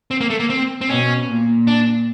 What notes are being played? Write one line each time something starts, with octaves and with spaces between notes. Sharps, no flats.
C4
A#3
A3
A#3
C4
C4
B2 C#4
A#2
D4